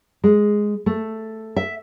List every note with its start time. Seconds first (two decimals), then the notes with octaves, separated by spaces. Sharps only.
0.24 G#3
0.86 A3
1.56 E5